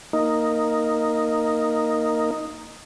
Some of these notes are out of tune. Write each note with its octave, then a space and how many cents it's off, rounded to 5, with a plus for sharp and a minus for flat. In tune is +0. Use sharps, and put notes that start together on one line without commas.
A#3 -5 D#4 +0